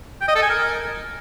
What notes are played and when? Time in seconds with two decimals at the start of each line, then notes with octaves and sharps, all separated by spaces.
0.21 G5
0.28 D#5
0.35 A4
0.43 G#5
0.50 A#4